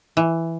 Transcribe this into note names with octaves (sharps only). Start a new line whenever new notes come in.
E3